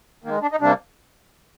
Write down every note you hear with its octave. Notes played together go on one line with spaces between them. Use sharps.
D#3 G#3 A#3
D4
D#4
C3 G3 A#3 D4